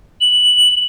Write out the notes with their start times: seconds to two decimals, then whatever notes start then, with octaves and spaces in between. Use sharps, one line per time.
0.21 F#7